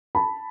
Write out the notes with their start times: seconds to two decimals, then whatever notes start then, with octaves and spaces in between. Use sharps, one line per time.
0.15 A5 B5